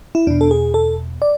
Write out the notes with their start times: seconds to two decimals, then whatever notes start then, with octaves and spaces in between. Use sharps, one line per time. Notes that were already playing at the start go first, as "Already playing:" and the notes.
0.15 E4
0.27 E2 B2 D4
0.41 A4
0.51 G#4
0.74 A4
1.22 D5